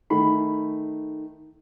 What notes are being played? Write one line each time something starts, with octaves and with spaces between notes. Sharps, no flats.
D#3 A3 B5